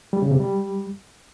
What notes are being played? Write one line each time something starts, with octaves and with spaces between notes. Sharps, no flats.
G3
C#3
C3
G3